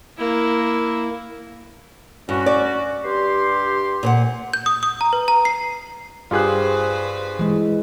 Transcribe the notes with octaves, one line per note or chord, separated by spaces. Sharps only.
A#3 E4
G2 C#4 F#4
D5
G2 G4 C6
A#2 C5 F#5
G6
D#6
D#6
A#5
B4
A#5
C7
G2 F4 G4 G#4 B4 C5 F#6
E3 G#3